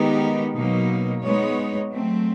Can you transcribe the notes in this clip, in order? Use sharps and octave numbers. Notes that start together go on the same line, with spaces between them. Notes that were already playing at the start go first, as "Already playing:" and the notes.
Already playing: D#3 G#3 B3 D#4 G4
B2 F#3 A#3 D#4
G#3 B3 D#4 G#4 C#5
F#3 A3 C4